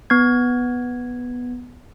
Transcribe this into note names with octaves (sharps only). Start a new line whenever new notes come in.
B3 G#6